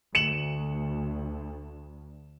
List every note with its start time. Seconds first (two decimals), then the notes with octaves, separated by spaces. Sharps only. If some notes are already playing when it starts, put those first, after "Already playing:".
0.15 D2 C#7 E7 F#7